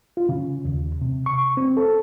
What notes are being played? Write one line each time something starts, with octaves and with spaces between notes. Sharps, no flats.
F4
C#3
D#2
C3
C#6
C4
A4